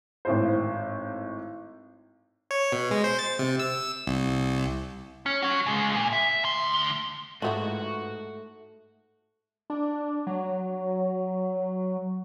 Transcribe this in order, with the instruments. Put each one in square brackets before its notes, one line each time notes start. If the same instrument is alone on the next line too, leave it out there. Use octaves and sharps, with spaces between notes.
[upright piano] G#1 A2 C5
[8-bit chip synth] C#5
B2
G#3
C5
A6
C3
E6
C2
[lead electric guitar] C#4
F#4 C#5
C#3 G#3
A#2
E5
D2 C6
[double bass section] G#2 [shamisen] F3 B3 E4 [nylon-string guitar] A3 [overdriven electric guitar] F#4
[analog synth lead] D4
F#3